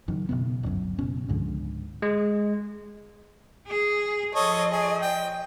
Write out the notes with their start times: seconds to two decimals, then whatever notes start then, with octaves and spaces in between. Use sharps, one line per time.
0.08 F#1 F#2 D#3
0.29 F#1 C#2 B2 B3
0.63 D1 G1 F#2
0.99 F#1 B2 C#4
1.28 C#2 G#2 D3 F3
2.02 G#3
3.67 G#4
4.35 F3 A4 C#5 D#5 D#6
4.71 G#4
5.02 G5